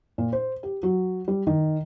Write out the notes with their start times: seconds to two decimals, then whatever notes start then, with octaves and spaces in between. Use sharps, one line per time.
0.18 A#2
0.33 C5
0.63 G4
0.83 F#3
1.28 G3
1.47 D#3